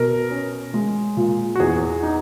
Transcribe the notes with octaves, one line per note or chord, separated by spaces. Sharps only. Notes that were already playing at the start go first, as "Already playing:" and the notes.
Already playing: B2 A#4
C#4
G#3
A#2
F#4
E2 G#4
D#4